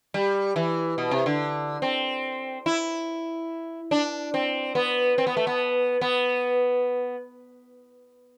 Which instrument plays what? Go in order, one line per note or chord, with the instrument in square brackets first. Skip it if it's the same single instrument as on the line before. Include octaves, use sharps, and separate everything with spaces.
[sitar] G3
E3
B2
C3
D3
C4
E4
D4
C4
B3
C4
B3
A3
B3
B3